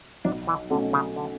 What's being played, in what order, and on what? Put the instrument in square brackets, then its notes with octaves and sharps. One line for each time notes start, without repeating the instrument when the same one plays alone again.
[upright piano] B1 [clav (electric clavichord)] D4
[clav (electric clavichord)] E3
[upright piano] B2 A3 C#4 [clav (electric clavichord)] D3
[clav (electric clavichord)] C#3
D3